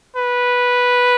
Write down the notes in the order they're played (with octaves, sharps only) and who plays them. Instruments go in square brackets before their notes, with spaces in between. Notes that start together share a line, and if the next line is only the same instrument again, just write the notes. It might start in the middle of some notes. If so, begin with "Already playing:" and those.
[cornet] B4